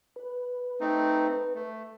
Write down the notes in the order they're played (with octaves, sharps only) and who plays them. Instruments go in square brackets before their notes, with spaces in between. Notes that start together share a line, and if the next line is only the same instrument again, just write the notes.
[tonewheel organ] B4
[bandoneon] A3 C4 D#4
A3